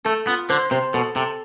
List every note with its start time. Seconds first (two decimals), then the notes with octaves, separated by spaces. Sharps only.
0.05 A3 A4
0.27 B3 F4
0.49 D3 C5
0.71 C3 C5
0.94 B2 A4
1.16 C3 A4